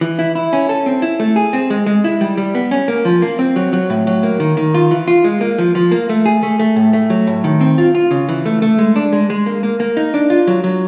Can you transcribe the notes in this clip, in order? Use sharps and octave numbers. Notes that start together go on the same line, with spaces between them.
E3
E4
E4
C#4
A4
C4
E4
A3
G#4
C4
G#3
G#3
E4
G3
G3
B3
C#4
A#3
F3
A#3
C4
F#3
F#3
A2
F#3
A#3
D#3
D#3
F4
E3
F4
G#3
A#3
F3
F3
A#3
A3
G#4
A3
A3
A2
A3
F#3
A2
D#3
C4
F4
F4
C#3
E3
A3
A3
G#3
D4
G#3
G#3
A#3
A#3
A#3
D#4
D4
F4
F#3
F#3